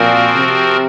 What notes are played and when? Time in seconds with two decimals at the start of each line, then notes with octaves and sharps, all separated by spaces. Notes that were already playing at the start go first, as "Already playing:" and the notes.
Already playing: A#2 F3 C4 F#4 A#4
0.36 C3